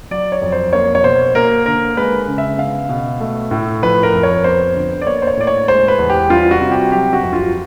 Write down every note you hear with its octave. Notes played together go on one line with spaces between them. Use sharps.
F#3 D5
C#5
F2
C5
A#3 C#5
C#5
B2 C5
A#3 A#4
D3 A#4
G#3 B4
C#3
E5
B3 F5
B2
A3
A2
F3 B4
A#4
F2
C#5
B3 C5
D3
D5
A#3 C#5
C5
C#5
A2 D5
C#5
G#3 C5
B4
E2
G4
G3 F4
F#4
C3
G4
F#3 G4
F#4
F2
F4